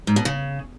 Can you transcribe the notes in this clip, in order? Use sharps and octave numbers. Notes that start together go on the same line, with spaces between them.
G#2
B2
C#3